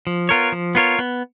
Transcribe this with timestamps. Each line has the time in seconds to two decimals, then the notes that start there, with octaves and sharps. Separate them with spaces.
0.07 F3
0.29 B3 F4 A#4 C#5
0.52 F3
0.75 B3 F4 A#4 C#5
0.99 B3